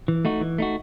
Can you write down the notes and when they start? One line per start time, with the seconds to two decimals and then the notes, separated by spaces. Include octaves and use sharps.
0.08 E3
0.25 A3 D#4 F#4
0.41 E3
0.58 A3 D#4 F#4